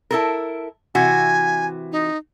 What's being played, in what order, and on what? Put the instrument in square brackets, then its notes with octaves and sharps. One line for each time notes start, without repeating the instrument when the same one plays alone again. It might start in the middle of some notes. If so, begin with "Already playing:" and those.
[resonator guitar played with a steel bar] E4 A4 A#4
[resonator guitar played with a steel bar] C3 E3 F#4 [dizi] G#5
[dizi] D#4